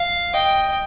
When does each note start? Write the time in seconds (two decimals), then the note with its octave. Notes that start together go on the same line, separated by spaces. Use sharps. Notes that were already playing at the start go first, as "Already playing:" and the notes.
Already playing: F5
0.34 D#5 G5
0.69 D#5